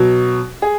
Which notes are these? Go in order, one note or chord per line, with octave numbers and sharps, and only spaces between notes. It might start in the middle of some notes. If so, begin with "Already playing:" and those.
Already playing: B2 F#3
G#4